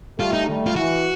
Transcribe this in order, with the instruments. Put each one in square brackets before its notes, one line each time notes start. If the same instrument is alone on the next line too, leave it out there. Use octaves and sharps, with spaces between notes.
[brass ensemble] G3 A3 [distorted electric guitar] F4
[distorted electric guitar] D#4
[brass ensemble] G3 A3
[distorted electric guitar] F4
[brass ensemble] E3 [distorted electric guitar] F#4